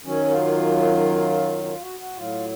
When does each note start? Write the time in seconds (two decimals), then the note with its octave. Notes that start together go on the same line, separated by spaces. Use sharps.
0.04 F#2 D#3 F#3 C#4
0.31 F4
1.63 F4
1.81 F#4
1.99 F#4
2.17 A2 F#3 F4